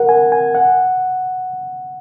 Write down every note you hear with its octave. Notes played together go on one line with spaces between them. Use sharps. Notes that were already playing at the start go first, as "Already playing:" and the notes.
Already playing: A#4 F#5
G#5
G#5
F#5